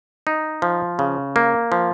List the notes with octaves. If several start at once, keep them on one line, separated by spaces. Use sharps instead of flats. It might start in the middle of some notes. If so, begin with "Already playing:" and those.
D#4
F3
C#3
A#3
F3